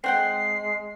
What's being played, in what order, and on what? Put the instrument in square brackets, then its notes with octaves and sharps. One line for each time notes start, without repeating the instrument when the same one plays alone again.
[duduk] G#3 [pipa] C4 F#5 G5 [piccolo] C7